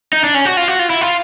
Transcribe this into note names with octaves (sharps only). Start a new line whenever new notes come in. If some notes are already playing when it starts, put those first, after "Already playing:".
D#4
D4
C#4
F#4
F4
F#4
F4
E4
F4